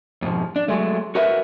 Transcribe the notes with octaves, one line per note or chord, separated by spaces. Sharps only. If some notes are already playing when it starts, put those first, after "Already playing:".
F2 G#2 B2 F3
D4
F#3 G#3 A3
F#4 A#4 B4 E5